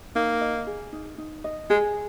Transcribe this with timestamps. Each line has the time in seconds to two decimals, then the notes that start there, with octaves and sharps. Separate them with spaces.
0.15 A#3 D#4
0.41 D#5
0.67 G#4
0.93 D#4
1.18 D#4
1.44 D#5
1.70 G#3 G#4